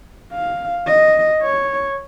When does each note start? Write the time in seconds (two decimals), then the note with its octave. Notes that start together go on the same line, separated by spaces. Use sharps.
0.33 F5
0.88 D#5
1.42 C#5